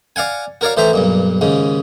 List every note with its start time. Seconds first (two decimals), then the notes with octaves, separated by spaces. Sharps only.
0.16 D5 F5 F#5 G#5
0.61 F#4 A#4 C#5 D5 F5
0.77 A2 E3 C5 E5 A#5
0.93 B1 G2 A#2
1.41 D#2 G#2 C#3